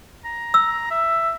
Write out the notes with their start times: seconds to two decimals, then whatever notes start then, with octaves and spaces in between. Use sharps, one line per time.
0.25 A#5
0.54 E6
0.91 E5